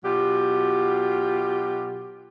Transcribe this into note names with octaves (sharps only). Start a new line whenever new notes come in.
B2 F#3 F4 G4